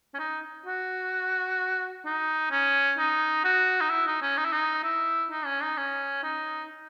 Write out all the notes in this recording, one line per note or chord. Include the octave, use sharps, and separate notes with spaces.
C#4
D#4
F#4
D#4
C#4
D#4
F#4
D#4
E4
D#4
C#4
D#4
E4
D#4
E4
D#4
C#4
D#4
C#4
D#4